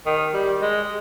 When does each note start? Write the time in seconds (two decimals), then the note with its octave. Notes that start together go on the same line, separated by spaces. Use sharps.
0.06 D#3
0.34 G3
0.61 G#3